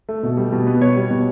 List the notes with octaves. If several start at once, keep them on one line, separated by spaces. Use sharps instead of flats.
A3
B2
G3
B2
B3
B2 C#5
G3
B2